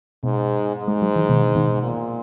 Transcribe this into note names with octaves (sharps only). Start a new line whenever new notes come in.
G#2 B2
G#2
G#3
F#3
E3
B2 D#3
B2 D#3
A#2